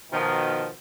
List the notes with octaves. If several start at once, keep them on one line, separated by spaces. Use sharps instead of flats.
B2 D#3 F3